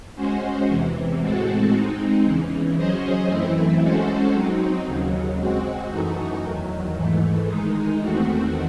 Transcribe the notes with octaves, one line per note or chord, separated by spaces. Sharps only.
G#3 C#4 F#4 C5
E2 C3 E3
A2 G#3 C4 F#4 A4
G#3 C4 D#4
E2 C#3 E3
F#3 C#4 G#4 C5 D#5
F#2 E3 A3 C4 E4
G#3 C#4 F#4 A4 C5
F#3 C4 D#4
D#2 C#3 F#3
G#3 C4 F#4
F#2 E3 A3 D#4 F#4
E2 D#3 F#3
G#2 E3 A3
D#3 G#3 D#4
E2 D#3 A3 C4 F#4